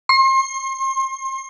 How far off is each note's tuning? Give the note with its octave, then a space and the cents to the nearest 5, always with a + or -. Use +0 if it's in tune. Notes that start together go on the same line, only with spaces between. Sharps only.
C6 +35